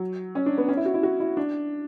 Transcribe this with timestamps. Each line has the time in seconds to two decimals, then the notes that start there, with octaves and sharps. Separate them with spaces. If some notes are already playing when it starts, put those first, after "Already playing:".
Already playing: F#3
0.35 C#4
0.46 D4
0.58 B3
0.68 C#4
0.77 E4
0.85 F#4
0.94 E4
1.03 F#4
1.20 E4
1.37 D4